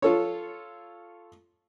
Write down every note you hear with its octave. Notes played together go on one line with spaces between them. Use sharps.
F4 A4 C#5